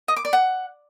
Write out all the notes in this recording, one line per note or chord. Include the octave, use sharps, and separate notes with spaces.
D#5
D6
D5
F#5